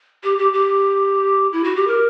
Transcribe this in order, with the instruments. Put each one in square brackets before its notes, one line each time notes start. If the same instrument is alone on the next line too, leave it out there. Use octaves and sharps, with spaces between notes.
[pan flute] G4
G4
G4
E4
F#4
G4
A#4